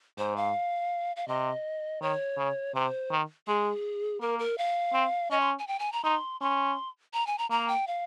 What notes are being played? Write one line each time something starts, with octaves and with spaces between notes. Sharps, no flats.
G#2 C5
F5
F5
C3 D#5
D#3 C#5
C#3
C3 C5
D#3
G#3 G#4
A#3 A#4
A#4
F5
C4
C#4 D#5
C6
G#5
G5
G#5
A#5
D#4 C6
C#4 C6
A#5
G#5
A#5
A#3 A#5
G5
F5